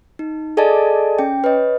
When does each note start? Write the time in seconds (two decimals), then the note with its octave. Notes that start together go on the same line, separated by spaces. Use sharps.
0.19 D#4
0.57 G#4 A4 D5 D#5 G#5 A5
1.19 C#4 G5
1.44 B4 C#5 D#5